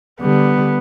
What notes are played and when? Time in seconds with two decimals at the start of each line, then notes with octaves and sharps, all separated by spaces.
0.21 D3 G3 B3